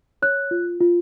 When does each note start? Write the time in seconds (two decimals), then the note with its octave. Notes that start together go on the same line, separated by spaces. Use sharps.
0.22 C#5 F#6
0.51 F4
0.81 F4